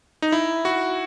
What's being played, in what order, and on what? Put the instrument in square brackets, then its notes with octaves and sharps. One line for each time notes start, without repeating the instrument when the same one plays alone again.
[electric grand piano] D#4
E4
F#4